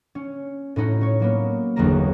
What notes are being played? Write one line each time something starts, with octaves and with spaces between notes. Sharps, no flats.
C#4
A2 C#4 D#4 F#4
C#4 C#5
F#3 A#3 B3
G1 E2 F#3 G#3 A#3 A#5